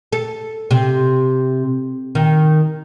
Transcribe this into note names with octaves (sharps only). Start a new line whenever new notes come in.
A4
C3
D#3